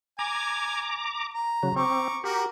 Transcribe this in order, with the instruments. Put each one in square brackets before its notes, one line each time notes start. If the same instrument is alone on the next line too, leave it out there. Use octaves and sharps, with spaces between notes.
[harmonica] G#5 [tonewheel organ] A#5 D6
[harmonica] A#5
[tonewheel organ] C#3 F#3
[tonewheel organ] C4 [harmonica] A#5 C#6 D6
[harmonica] F#4 A#4 [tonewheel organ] G4